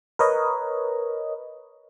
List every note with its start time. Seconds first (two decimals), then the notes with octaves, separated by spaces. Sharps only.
0.19 A#4 B4 C#5 D#5